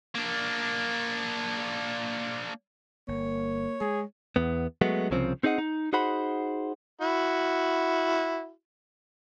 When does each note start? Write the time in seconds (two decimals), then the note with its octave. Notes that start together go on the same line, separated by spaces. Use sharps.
0.15 A#3 D4
3.08 G1 A#3 C#5
3.81 G#3 G#4
4.36 E2 B3
4.81 F#3 G#3 A3 B3
5.11 C2 C#3 F3 C4
5.43 C4 D#4 G#4 D#5 F#5
5.58 D#4
5.93 D#4 F#4 G#4 C5 F#5 B5
7.02 E4 F#4